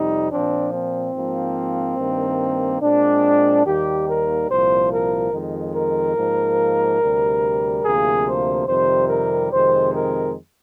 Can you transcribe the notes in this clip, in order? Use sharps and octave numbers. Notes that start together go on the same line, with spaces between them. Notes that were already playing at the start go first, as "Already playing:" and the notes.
Already playing: F2 C3 G3 D#4
A#2 F3 C4 D4
C4
G#2 F3 A#3
G2 D#3 A#3
A#2 G#3 C4 D4
D#2 D#3 G3 A#3 G4
A#4
C2 A#2 F3 C5
A#4
F2 D#3 G#3
A#4
G#2 F3 A#3
D2 C3 G3
D2 C3 F3 A#3 G#4
C5
F2 C3 D#3 G3 C5
A#4
F2 C3 D#3 G#3 C4 C5
A#4